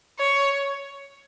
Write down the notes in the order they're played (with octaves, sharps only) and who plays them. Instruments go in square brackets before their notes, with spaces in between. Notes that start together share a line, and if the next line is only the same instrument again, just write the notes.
[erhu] C#5